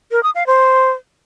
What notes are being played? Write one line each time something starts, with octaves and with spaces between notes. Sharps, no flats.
A#4
D#6
F5
C5